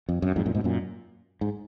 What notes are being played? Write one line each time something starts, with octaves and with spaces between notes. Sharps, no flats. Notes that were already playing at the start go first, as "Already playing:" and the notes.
F2
F#2
F2 G#2
F#2 A#2
G#2 B2
F#2 A#2
G#2